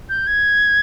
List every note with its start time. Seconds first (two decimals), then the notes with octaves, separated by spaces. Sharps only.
0.09 G6
0.27 G#6